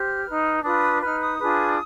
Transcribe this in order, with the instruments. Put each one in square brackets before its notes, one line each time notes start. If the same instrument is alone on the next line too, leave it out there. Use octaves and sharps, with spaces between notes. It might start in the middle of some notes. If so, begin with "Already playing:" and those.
Already playing: [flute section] G4 C5 F6
D#4 B4
D4 F4 B4 D#6
D#4 B4 F6
D#6
D4 F4 G#4 B4